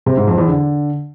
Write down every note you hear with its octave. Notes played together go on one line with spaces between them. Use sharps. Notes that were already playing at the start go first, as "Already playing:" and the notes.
C3
G#2
F2
E2
D3